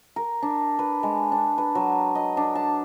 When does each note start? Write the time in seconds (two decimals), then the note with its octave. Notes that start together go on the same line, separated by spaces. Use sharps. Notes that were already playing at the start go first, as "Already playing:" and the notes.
0.16 A#4
0.43 D4
0.79 B4
1.03 G#3
1.32 D4
1.58 B4
1.75 F#3
2.15 D#5
2.37 D4
2.55 A5